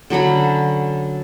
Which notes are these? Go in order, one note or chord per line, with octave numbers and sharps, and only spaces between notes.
D3 F#3 C#4 B5